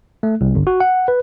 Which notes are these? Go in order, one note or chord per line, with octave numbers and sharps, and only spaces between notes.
A3
C2
G1
F#4
F#5
B4